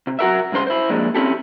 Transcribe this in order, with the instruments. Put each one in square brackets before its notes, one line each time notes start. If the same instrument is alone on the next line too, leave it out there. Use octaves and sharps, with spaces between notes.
[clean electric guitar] C3
F#3 F#4 A#4 E5
C2 G2 C#3 C5 C6
E4 C5
F3 G3 G#3 A#3 D4
C4 C#4 E4 G4 A4